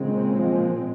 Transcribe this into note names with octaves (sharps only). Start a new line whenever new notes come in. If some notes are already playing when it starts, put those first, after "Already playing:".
Already playing: A#2 C#3 G#3 C4
F3